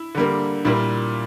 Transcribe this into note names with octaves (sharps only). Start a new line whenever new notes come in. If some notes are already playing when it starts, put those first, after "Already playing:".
Already playing: E4
D3 G3 A#3
A#2 G3 A#3 E4